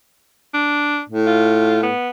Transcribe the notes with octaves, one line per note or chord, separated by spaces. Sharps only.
D4
A2
F4
B3